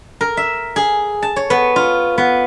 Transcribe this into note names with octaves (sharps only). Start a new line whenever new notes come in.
A#4
E5
G#4
A5
C#5
B3
F4
B3